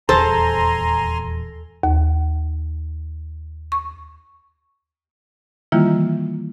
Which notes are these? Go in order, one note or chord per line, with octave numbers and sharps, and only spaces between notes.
D#1 E2 A4 C5 G#5 A#5 C6
D#2
C#6
D#3 E3 G3 A#3 E4 F4